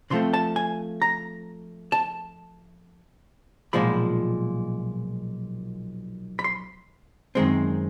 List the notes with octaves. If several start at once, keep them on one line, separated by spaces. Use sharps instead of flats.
C#3 F3 A3 C4 C6
A5
G#5
A#5
A5
B1 A#2 F3 G#3 B5
B5
C6
F#2 D#3 G#3 C4